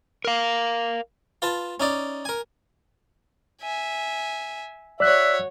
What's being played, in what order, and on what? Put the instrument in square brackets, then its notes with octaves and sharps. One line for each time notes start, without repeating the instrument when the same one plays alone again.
[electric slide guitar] A#4 F5
[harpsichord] F4 B4 A5
C#4 D#4 D5
A#4 G#5
[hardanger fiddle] E5 G#5
[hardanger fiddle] F#4 C#5 [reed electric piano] D5 F#6 [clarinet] E5